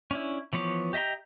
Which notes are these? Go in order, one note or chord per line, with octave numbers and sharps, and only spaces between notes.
C#4 D4 E4
E3 F3 B3 C#5 D6
G4 D#5 E5 G5 A#5